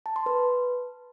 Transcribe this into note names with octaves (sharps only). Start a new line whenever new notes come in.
A5
C6
B4